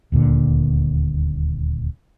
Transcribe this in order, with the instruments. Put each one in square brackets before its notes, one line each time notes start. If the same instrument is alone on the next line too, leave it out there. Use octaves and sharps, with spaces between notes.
[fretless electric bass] D#1 D2 A#2 D3